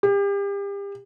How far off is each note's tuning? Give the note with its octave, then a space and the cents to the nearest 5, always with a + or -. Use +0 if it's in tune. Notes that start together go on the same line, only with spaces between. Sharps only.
G4 +35